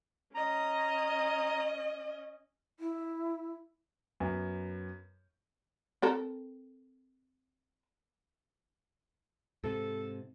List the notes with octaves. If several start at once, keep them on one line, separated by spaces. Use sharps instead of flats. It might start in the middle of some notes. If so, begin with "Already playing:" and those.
C#4 D#5 A#5
E4
F#2 B3
C4 A4 A#4
G#2 C3 A4